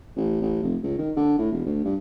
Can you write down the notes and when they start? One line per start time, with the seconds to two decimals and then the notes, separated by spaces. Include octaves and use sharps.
0.16 A1
0.42 A1
0.63 F1
0.84 C#2
0.98 D#3
1.16 D3
1.39 A2
1.52 E1
1.65 D2
1.85 G2